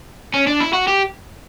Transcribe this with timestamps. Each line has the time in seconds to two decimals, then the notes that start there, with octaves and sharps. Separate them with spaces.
0.34 C#4
0.47 D4
0.60 E4
0.73 F#4
0.87 G4